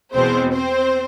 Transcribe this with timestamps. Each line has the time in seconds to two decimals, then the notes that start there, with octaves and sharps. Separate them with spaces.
0.15 E2 B2 G#3 B3 C4 C5
0.54 C4 C5